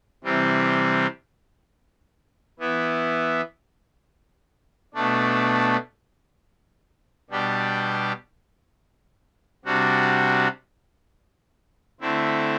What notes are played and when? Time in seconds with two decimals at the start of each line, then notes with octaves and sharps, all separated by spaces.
0.24 C3 E3 G3 C4
2.59 E3 B3 E4
4.94 B2 A3 D4
7.30 B2 G3 D4 G4
9.65 C3 G3 D4 F#4
12.01 D3 A3 C4 E4